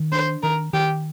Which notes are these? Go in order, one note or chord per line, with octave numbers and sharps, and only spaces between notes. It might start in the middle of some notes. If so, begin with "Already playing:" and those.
Already playing: D#3
D4 C5
D#3 A#4
D#3 G4